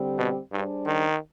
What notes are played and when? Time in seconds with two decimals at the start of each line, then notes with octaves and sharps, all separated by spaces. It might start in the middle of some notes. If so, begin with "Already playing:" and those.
Already playing: D3 G3 C4 G4
0.18 B2
0.52 G2 G3 D4 G#4 C5
0.86 D#3